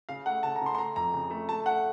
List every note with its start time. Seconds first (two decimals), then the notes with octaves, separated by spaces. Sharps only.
0.09 C#3 F5
0.26 A3 F#5
0.43 C#3 A5
0.56 A#5
0.61 C#3 C6
0.75 C6
0.78 A3 A#5
0.96 F2 A#5
1.14 C#3
1.30 A3
1.49 A3 A5
1.66 A3 F#5